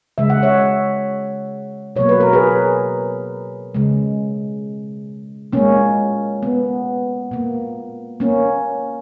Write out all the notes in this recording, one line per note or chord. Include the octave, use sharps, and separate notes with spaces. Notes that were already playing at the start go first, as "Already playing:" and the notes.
C#3 G#3 E5
F#5
C#5 E5
B2 F#3 A#3 C#5
B4
A#4
G#4 B4
C#3 G#3
A#2 G#3 A#3 C#4
B3
A#2 A#3
A#3 C#4